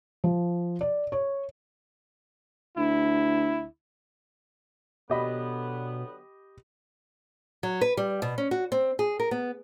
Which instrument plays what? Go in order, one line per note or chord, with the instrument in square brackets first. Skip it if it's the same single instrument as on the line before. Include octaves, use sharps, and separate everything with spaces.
[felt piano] F3
D5
C#5
[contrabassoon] D2 [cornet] E4
[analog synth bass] B2 [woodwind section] D3 F#3 B3 [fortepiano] G4 D#5 B5
[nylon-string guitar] F#3
B4
G3
B2
C#4
F#4
C4
G#4
A#4
B3